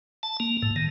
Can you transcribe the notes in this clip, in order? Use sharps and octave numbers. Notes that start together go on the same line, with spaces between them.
A5
A#3
A2
D#3